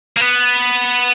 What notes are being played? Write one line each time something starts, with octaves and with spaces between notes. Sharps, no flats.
A#3
B3